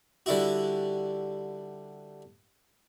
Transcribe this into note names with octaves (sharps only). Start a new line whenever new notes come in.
D3 G3 E4 F#4